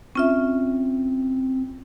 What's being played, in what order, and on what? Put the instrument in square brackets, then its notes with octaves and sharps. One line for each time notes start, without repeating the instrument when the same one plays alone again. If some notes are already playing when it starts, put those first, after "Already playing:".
[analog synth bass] C4 [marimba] C#4 F4 E5